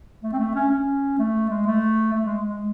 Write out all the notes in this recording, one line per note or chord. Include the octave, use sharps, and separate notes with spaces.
A3
C4
A3
C#4
C#4
A3
G#3
A3
A3
G#3
G#3